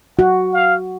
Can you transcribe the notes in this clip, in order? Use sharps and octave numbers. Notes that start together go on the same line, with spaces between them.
F#4 F#5
F5